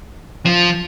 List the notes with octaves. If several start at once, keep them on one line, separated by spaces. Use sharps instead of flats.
F3